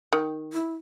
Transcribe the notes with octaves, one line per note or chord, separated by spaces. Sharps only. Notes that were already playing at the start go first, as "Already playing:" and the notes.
D#3
E4